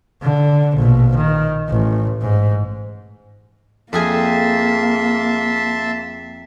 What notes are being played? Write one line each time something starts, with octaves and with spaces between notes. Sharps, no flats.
D3
A#1 B2
D#3
A1
G#2
F2 A#3 G#4 E5 G#5 A5 C6